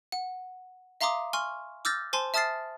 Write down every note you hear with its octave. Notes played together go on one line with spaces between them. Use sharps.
F#5
E5 F5 A#5 C6 D6 D#6
G#5 C6 C#6 F6
D6 E6 F6 G6 A6 A#6
C5 G#5 A5 C6
E5 A5 D#6 F6 A6 C7